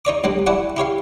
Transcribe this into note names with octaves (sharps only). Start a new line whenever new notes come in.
D#4 C#5 D5 D6
D2 F#3 G3 D4
E4 F#4 D5 F#5 G#5 A5
E4 G4 C#5 F5